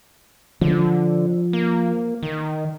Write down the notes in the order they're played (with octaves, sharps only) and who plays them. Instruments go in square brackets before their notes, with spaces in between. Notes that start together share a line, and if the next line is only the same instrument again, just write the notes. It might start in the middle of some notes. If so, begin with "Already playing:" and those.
[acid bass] D3 [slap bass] F3
[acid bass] A#3
D#3